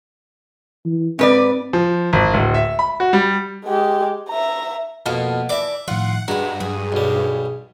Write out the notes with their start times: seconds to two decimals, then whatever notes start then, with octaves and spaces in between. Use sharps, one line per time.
0.85 E3
1.19 G#2 C4 B4 D5
1.73 F3
2.13 G#1
2.34 D1
2.54 E5
2.79 B5
3.00 F#4
3.13 G3
3.66 G#3 G4
4.29 E5 A#5
5.06 F2 B2 A#3 B3 A5
5.49 E3 D5 E5 D6
5.88 A2 D#3 F3 F4 F#5
6.28 G2 G#3 F#4 B4 A#5
6.60 F#3 G#4
6.92 B1 G3